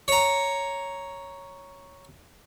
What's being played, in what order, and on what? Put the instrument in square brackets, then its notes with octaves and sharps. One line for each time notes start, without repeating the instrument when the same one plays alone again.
[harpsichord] C#5 A#5